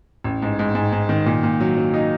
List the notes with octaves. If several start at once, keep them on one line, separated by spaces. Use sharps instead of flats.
A1
G#2
G#2
G#2
G#2
D#3
A#2
A#2
F#3
F#3
D#4